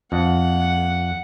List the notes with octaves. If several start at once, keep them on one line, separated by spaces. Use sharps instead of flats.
F2 F#5